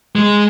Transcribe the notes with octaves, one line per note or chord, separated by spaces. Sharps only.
G#3